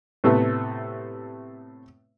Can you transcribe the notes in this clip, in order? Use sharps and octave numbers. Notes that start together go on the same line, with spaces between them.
A2 C3 A3 B3